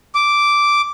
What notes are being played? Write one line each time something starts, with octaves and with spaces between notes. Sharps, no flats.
D6